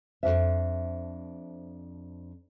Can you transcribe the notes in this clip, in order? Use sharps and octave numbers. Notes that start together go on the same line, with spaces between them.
F2 G#2 D4 C5 E5